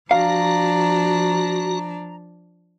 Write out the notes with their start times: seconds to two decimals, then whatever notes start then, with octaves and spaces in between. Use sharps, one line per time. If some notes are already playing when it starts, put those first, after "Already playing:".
0.11 F3 D4 F#4 F5 A#5